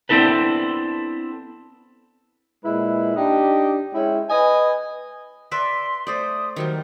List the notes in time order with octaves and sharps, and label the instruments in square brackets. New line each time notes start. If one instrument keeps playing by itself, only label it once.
[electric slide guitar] B3 C4 D4 E4 A4 B4
[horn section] A#2 G#3 E4 B4
D4 D#4 G4
G#3 C#4 E4 G5
B4 D#5 G#5
[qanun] B4 D5 E5 [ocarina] C6
[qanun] A3 C5 D5 [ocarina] D#6
[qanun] D#3 F#3 G3 [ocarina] C5